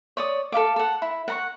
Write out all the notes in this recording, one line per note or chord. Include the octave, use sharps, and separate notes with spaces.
C#5 D5 D#6
A4 E5 F5 D6
A4 F#5
E4
F#5 A#5 C#6